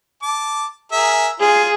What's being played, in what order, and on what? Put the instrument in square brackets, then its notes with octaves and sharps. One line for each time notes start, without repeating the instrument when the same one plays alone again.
[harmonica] A5 D6
G#4 A#4 E5
[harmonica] F4 [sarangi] G#4